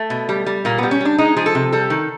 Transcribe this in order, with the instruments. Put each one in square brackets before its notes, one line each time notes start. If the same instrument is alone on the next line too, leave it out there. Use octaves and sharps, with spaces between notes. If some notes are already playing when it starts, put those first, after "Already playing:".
Already playing: [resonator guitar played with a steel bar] A3
B2
G3
G3
A#2 A#3
G3 B3
C#4
G3 D4
G#3 D#4
F3 G#4
A4
C3
G3 A4
D#3